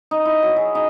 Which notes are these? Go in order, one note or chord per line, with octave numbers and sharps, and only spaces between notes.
D#4
E4
F#3
G#4
D#4